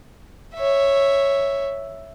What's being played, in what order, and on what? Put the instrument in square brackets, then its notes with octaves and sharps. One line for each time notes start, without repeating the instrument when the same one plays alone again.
[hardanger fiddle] C#5 E5